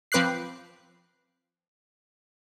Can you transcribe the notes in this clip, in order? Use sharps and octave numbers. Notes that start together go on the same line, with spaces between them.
F3 C4 B4 D6 F#6 C7